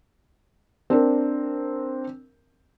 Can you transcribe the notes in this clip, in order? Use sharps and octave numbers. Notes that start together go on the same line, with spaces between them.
C4 D4 A#4